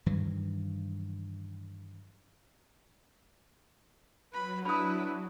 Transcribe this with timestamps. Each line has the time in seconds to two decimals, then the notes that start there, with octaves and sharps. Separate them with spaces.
0.06 G2 D#3 E3 F#3
4.33 F#3 B4 B5
4.65 D4 E4 B4 B5 D#6